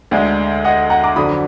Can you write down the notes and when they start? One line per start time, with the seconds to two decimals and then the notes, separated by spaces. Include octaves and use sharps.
0.11 D2 D3 G#3 D4
0.65 D#5 F#5
0.90 F#5 A#5
1.03 A#5 D6
1.16 F2 D3 F#3 D4 B5 D#6